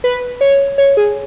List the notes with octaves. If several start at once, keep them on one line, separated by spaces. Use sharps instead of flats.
B4
C#5
C#5
G#4